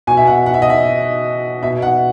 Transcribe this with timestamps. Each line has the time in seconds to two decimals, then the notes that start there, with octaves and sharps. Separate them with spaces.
0.07 B2 G#5
0.17 E5
0.27 F#5
0.46 F#5
0.54 E5
0.62 D#5
0.70 E5
1.62 B2 E5
1.82 F#5